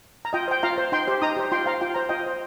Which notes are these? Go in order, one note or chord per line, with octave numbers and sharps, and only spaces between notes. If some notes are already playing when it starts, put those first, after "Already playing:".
A#5
F4 D#5 G5
C5 G5
F4 F5 A#5
C5
D#4 G5 C6
G4 C5
D#4 A#5 D#6
G4 C5
F4 G5 C6
C5 F5 A#5
F4 G5
C5 A#5
F4 D#5 G5
C5